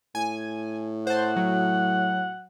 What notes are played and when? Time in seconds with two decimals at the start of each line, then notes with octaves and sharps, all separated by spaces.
0.15 A2 G#5
1.07 C5 F#5 A5
1.36 F#3